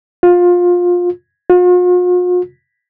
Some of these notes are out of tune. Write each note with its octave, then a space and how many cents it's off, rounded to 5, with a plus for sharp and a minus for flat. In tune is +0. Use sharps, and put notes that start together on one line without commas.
F4 +20
F4 +45